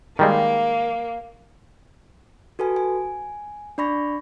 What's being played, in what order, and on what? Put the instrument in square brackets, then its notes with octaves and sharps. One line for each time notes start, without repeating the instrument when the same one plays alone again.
[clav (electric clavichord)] D#3 G3 G#3 [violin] A#3
[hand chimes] F#4 A4 B4 G#5
G#5
D4 D5 B5 C#6 A#6